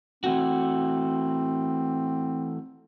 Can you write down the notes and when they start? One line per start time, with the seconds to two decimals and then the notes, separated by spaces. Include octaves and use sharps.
0.24 E3 A3 C4 F#4